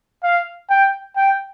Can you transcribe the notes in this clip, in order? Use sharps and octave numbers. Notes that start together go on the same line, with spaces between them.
F5
G5
G5